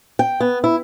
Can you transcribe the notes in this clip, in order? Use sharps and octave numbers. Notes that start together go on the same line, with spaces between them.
G5
B3
E4